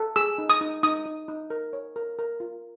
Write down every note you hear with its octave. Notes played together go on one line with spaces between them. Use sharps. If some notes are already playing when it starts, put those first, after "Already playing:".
Already playing: A4
G#4 E6
D#4
D#6
D#4
D#4 D#6
D#4
D#4
A#4
C#5
A#4
A#4
F4